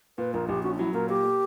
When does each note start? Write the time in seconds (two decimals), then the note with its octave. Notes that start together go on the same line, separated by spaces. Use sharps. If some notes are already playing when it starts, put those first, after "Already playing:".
0.18 A#2 B4
0.34 A#1 A#4
0.48 A#1 G4
0.63 C#4 F#4
0.74 D4
0.79 F#3 E4
0.94 A#2 A#4
1.09 A#3 G4
1.24 A#3